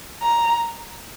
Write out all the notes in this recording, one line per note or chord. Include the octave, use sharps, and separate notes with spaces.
A#5